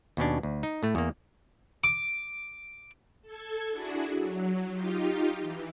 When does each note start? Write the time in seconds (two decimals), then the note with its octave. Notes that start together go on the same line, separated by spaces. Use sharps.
0.17 D#2 B2 C#4 D4
0.43 D2
0.63 D#4
0.83 A2 A3
0.95 E2 A#3
1.84 D6
3.22 A4 G#6
3.70 D4 E4 F#4 G#4
4.12 F#3
4.70 D#4 F4 G4
5.39 E3